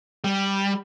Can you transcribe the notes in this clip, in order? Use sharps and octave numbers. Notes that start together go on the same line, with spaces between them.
G3